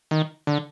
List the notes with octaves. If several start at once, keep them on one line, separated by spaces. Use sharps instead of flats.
D#3
D3